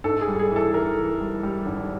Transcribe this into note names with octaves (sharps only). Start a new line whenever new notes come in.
G#2 A4
G#4
G3
G#4
E3 A4
E3 A#4
E3
G3
G3
G#1